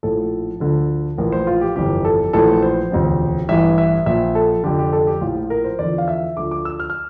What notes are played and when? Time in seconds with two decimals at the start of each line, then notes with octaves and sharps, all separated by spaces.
0.03 A#1 A2 F3 A4
0.60 D2 D3 F3
1.18 A#1 A2 E3 A#4
1.32 C5
1.47 F4
1.61 G4
1.76 G1 F2 C3 E3 G4
2.05 A4
2.33 A#1 A2 E3 A4
2.62 C5
2.91 E1 D2 C3 F3
3.49 A1 G2 E3 E5
3.78 E5
4.06 A#1 A#2 F3 E5
4.35 A4
4.64 F1 F2 D3 G4
4.79 G4
4.93 A4
5.07 G4
5.21 A#1 A2 F3 F4
5.50 A#4
5.64 C5
5.79 E2 D3 F3 D5
5.98 F5
6.08 E5
6.37 D2 D3 F3 D6
6.51 D6
6.65 E6
6.80 F6
6.90 F6